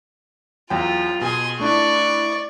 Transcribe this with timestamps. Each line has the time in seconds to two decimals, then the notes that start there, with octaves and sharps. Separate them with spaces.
0.70 E2 F#3 F4 G5
1.21 B2 G#4 C6
1.60 A3 D4 E4 D5 C#6